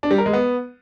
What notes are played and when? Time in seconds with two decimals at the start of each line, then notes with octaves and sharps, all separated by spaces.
0.03 D4
0.11 G3
0.18 A#4
0.26 G#3
0.33 B3